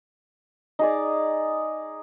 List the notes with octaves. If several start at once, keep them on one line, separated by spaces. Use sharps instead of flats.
D#4 G#4 D5